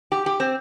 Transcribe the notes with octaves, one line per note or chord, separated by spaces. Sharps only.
G4
G4
C4